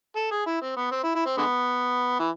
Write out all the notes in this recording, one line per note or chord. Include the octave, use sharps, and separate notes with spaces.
A4
G#4
E4
C4
B3
C4
E4
E4
C4
D3 G#3 B3
E3